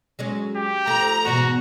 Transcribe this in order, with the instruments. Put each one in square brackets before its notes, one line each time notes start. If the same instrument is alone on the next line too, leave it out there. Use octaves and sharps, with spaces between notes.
[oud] F#3 G#3 C#4
[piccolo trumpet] G4
[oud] F3 A3 [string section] A#5
[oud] E2 G#2 B2 [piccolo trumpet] F#4